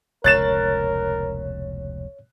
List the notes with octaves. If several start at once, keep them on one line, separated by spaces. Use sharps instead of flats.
F1 C#2 B2 A#4 C#5 F#6 A6 E7